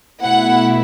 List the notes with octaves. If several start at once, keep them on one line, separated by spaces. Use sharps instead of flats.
B2 A3 E4 F#5